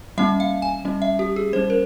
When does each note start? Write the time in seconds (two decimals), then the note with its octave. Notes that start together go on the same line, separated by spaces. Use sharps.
0.18 G3 A#3 C#4 E5
0.40 F5
0.62 G#5
0.85 G3 C#4
1.02 E5
1.19 G4
1.36 G#4
1.53 G3 A#3 C#4 C5
1.70 A#4